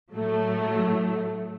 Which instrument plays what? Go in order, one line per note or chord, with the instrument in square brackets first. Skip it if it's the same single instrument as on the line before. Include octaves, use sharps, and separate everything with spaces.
[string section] A2 F#3 A3